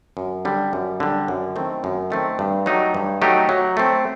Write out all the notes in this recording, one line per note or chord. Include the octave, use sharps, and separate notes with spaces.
F#2
D3 G3
F#2
D3 G3
F#2
D#3 A3 C4
F#2
D#3 A3 C4
G2
F#3 A3 D#4 G4
G2
F#3 A3 D#4 G4
F#3
A3 C4